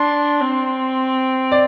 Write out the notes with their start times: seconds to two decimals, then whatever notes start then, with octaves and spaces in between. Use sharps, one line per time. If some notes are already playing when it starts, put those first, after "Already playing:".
Already playing: D4 C6
0.41 C4
1.52 D5